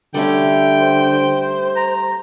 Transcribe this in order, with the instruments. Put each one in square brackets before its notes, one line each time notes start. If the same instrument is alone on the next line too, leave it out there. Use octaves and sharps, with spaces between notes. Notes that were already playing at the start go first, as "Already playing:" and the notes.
[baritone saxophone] D3 [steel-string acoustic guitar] G3 A3 C#4 [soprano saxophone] G5
[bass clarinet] C5
[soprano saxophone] A#5